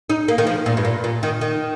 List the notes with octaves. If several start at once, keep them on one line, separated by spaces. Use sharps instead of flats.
D#4
A#3
D#3
F3
A#2
G2
A#2
A#2
D#3
D#3